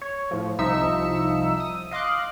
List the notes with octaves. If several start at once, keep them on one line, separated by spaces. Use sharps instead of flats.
C#5
A2 F3
C2 F3 D#4 E5 E6 C#7
D#6
D#5 F5 C6 D6 F#6